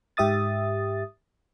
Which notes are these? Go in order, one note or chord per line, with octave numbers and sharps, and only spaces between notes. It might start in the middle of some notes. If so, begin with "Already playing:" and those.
G#2 G4 E5 D#6 A6